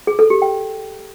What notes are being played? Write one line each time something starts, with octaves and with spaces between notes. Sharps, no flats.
G#4
A4
G4
G5